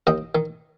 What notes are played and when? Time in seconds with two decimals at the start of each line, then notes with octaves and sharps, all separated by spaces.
0.07 D#2 D#5 G5
0.35 D#3